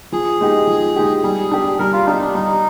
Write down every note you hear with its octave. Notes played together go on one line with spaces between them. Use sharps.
F3 G#4
G#3 D#4 G4
F3
G#3 D#4 G4
G3 G#4
D4 G4
G3 A#4
F4
D4 D#4 G4
D4
G3 D#4